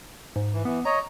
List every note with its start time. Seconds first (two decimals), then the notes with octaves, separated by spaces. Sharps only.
0.36 G#2
0.53 E3
0.65 E3 B3
0.85 C#5 D#5 A#5